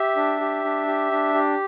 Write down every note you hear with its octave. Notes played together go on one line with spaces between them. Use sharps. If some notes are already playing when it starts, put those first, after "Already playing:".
Already playing: G4 E5
D4
G4
D4
G4
D4
G4